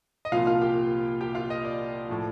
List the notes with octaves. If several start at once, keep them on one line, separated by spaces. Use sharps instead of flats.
D#5
C2 A#2 F3 F4 F5
F4 F5
G4 G5
G4 G5
F4 F5
D#5
D5
A2 F3